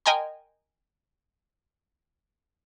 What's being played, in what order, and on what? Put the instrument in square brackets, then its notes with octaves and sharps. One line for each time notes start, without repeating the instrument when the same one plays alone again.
[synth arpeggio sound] A#4 D#5 G5 G#5 A#5 C6